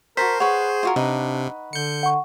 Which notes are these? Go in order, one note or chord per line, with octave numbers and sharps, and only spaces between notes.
F#4 A#4 C5 A5 A#5 B6
G#4 B4 C#5 F#5 C#6
F4 F#4 A#4
C3 D4 D#4 B4
D3 G6 C#7
F#5 C#6